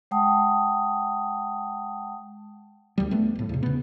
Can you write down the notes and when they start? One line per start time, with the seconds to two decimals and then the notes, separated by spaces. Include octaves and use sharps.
0.11 G#3 F#5 G5 A5 D#6
2.98 D2 G3
3.11 A3 B3
3.35 D1 A2
3.49 E2 C3
3.63 C#3 B3